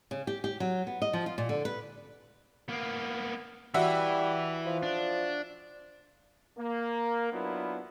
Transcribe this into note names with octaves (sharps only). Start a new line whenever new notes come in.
C#3
G4
G4
F#3
B3
D#5
F3
F4
A#2
D3
B4
A#3 B3
E3 G3 F#4 E5
F3
D4
A#3
F#3 B3 D4 E4 F4